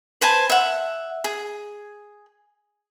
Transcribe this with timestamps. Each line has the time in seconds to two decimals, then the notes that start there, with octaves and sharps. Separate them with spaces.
0.21 B4 C5 G#5 A5
0.50 E5 F#5
1.24 G#4